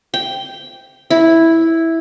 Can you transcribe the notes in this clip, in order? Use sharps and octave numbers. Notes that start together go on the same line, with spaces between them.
G5
E4